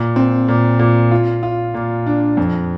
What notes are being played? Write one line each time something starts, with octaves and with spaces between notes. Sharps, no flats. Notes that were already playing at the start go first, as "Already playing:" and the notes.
Already playing: A#2
C4
A#2
A#2
F4
F4
A#2
D4
F2